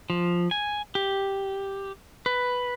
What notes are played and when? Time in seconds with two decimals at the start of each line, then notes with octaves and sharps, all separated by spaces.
0.10 F3
0.51 G#5
0.95 G4
2.26 B4